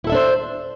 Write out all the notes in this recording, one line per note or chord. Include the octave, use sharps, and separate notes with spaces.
D4 E4 A4 C5 E5